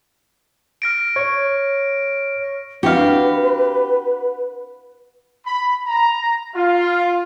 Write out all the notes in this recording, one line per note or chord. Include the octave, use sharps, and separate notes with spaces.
F6 A#6 D7
C#5
C4 D4 E4 F#4 G4 B4 F5
B5
A#5
F4